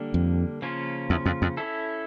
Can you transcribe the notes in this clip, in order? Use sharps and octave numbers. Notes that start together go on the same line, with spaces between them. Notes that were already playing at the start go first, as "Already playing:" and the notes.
Already playing: D3 G3 A#3 D4
F2
C#3 F3 A#3 C#4 F4
E2
F2
F2
C#4 E4 A4